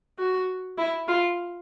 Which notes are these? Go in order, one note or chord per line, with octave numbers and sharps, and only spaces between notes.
F#4
E4
F4